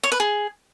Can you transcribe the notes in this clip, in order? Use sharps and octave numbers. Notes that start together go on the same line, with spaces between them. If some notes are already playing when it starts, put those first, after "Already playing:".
C#5
B4
G#4